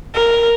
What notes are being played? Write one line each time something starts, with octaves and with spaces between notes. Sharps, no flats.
A#4